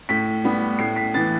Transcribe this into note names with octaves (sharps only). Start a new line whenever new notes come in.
A2 B6
G3 B3
A2 C7
B6
E3 B3 A6